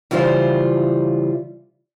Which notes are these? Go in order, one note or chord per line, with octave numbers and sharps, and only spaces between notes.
C#3 E3 G3 F4 C5